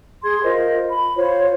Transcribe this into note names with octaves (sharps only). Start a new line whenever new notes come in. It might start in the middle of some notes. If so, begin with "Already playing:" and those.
G#4 C6 G#6
F4 A#4 C5 D#5
B5
F4 C5 C#5